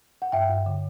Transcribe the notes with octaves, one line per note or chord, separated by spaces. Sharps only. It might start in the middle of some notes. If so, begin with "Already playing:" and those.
F#5
G2 E5 G5
G2
D3